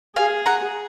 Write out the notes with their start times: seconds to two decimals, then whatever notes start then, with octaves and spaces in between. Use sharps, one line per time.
0.16 G#4 F5 G#5
0.46 F#5 A#5